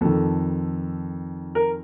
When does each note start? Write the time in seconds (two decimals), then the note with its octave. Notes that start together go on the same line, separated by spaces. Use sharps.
0.01 F2 D#3 A4
1.55 A#4